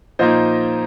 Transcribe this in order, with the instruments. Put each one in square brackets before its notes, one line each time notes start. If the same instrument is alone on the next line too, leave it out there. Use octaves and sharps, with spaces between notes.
[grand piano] A#2 F3 A#3 D#4 C5 D#5